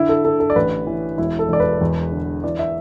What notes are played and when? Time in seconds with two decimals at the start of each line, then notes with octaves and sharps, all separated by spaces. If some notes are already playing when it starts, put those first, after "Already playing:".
Already playing: D3 E4
0.09 A4
0.25 D3 A4
0.40 A4
0.50 D5
0.55 A1 B4
0.87 E3
1.18 E1 E4
1.39 A4
1.49 E1 D5
1.60 B4
1.81 E2
2.12 D3
2.43 E3 D5
2.59 E5